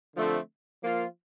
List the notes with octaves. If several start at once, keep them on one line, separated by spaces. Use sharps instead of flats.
D3 F3 A3 C4
F3 A#3 F4